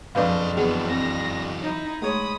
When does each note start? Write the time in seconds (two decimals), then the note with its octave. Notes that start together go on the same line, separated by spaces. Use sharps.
0.15 F#1 B1 F2 F3 D4 B4 D#5 F5
0.57 E3 F#3 B3 G#4
0.90 C4 A#6
1.62 D#4 E4
2.02 G#3 A3 C#5 B5 D#6